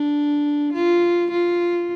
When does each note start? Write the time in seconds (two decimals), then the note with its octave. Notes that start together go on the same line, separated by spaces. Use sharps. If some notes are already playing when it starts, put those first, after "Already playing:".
Already playing: D4
0.73 F4
1.31 F4